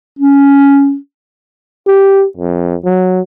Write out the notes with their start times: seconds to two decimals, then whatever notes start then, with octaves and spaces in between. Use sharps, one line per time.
0.19 C#4
1.87 G4
2.37 F2
2.85 F#3